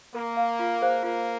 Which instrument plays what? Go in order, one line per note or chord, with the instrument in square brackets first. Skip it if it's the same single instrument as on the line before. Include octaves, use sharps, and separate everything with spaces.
[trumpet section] A#3 [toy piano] A#4
[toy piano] F5 A#5
F4
G#4 C5 F5
[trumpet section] A#3 [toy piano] F4